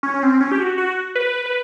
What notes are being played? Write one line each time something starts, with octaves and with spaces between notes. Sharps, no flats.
C#4
C#4
C4
C#4
G4
F#4
F#4
B4
B4